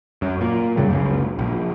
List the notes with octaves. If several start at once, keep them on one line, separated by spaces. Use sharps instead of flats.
F#2
A#2
F#2 C#3 F#3 G3
F#1 C#2 C#3
A#1